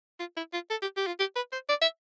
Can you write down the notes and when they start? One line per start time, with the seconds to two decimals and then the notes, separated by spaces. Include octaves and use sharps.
0.20 F4
0.37 E4
0.54 F4
0.70 A4
0.82 G4
0.97 G4
1.07 F4
1.20 G4
1.36 B4
1.53 C5
1.69 D5
1.82 E5